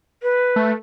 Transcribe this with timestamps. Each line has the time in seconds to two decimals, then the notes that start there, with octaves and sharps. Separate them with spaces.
0.23 B4
0.56 A3